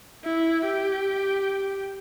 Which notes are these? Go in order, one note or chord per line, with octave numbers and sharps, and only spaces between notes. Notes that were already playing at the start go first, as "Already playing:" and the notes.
E4
G4